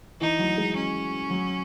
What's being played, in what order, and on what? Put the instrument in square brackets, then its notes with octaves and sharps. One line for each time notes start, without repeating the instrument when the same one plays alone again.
[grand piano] E3 [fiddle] D#4
[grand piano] F#3
G#3
[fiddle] C#4
[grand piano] F#3